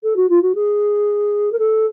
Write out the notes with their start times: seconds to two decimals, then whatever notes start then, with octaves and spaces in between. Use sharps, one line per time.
0.03 A4
0.16 F#4
0.29 F4
0.42 F#4
0.55 G#4
1.52 A#4
1.59 A4